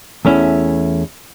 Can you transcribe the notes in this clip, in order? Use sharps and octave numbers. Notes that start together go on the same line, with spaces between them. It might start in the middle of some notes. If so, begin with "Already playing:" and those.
E2 A3 C#4 E4